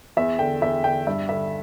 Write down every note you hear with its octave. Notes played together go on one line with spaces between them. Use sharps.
E2 E5
D3 G5
E2 E5
D3 G5
G2 E5
D3 E5